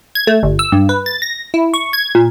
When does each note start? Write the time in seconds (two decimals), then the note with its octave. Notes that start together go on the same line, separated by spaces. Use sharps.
0.15 G#6
0.27 A3
0.43 G1
0.59 E6
0.72 G2
0.89 B4
1.06 A6
1.22 A#6
1.54 E4
1.74 C#6
1.93 G#6
2.15 A#2